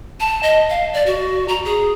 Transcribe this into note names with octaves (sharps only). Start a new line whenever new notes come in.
A5
D#5
F5
D5
F#4
A#5
G#4